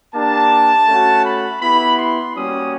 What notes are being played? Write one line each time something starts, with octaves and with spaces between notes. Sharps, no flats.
A#3 D4 G4 A5
A3 C#4 F#4
B5
B3 E4 G4 B5
C6
G3 A#3 C#4 F#4 D#6